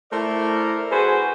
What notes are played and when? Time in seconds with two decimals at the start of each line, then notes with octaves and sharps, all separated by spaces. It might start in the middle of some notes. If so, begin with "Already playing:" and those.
0.11 A3 E4 A#4 C5 D5
0.90 F#4 G#4 B4 C5 G#5